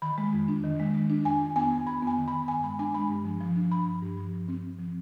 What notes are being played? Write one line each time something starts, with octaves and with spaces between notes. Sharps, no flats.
D#3 B5
G#3
F2
D4
D#3
G#3
G#3
D4
F2 G#5
F2
B3 G#5
F2
F2 B5
B3 G#5
D#3
B5
D#3
G2 G#5
G#3 B5
D4 G#5
G#3 B5
G2
F3
F3
D4
F3 B5
G2
G2
F3
G2
C4
C4
F3